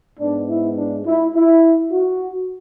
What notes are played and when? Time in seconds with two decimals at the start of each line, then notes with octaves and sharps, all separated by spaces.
0.20 G#2 G#3 B3 D4
0.49 E4
0.77 D4
1.06 E4
1.35 E4
1.92 F#4